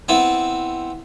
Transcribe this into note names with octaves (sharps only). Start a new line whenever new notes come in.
B3 C4 E4